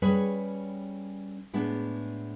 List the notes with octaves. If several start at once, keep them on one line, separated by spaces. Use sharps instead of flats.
G3 C#4 G#4 B4 C#5
A2 G#3 B3 D4